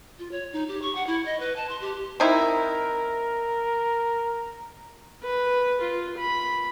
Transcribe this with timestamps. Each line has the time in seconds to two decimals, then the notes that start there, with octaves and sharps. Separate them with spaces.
0.19 F4
0.32 C#5
0.53 D#4
0.68 G4
0.82 C#6
0.95 F#5
1.07 E4
1.25 D#5
1.40 B4
1.56 A5
1.69 C6
1.81 G4
2.20 C4 D#4 E4 A#4
5.23 B4
5.81 F4
6.18 B5